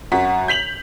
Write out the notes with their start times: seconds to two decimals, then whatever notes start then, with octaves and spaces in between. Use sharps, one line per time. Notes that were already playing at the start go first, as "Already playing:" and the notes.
0.12 F#2 F#4 B6
0.48 G6 B6 F7 F#7